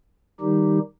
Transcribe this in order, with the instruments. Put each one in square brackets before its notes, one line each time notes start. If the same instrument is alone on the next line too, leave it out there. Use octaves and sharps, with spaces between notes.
[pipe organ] D#3 G3 D#4 G4